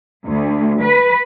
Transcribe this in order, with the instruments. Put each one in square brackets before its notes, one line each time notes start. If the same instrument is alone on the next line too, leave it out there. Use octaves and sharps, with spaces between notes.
[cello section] D2
B4